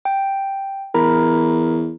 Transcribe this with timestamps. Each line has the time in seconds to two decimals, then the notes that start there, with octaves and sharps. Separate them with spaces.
0.05 G5
0.94 E2 A#4 A#5 B5